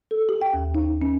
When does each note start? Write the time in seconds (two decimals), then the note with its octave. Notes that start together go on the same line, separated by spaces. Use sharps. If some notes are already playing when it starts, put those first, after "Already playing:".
0.11 A4
0.29 G4
0.41 G5
0.53 D#2
0.75 D#4
1.02 C#4